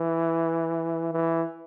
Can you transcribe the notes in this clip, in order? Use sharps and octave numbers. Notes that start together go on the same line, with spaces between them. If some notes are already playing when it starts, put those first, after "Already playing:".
Already playing: E3
E3